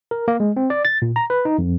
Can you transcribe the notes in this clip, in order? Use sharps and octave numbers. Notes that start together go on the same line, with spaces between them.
A#4
A#3
G#3
C4
D5
A6
A#2
A#5
B4
D#4
F2